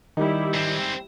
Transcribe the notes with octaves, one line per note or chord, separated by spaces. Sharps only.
D#3 G3 D#4 E4 G4
G#2 C4